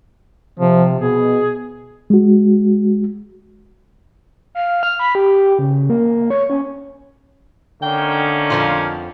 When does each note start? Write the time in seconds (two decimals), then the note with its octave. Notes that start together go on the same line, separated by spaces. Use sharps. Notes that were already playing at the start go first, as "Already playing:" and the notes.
0.60 C3 F3
1.00 B2 G#4
2.10 G#3 F#4
4.55 F5
4.83 F6
4.99 B5
5.15 G4
5.59 C#3
5.90 A#3
6.30 C#5
6.50 C#4
7.82 D3 D#3 A#3 C#4 G5
8.50 F2 F3 F4 F5